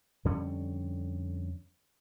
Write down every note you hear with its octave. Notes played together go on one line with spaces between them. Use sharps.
F2 D3 G3 C#4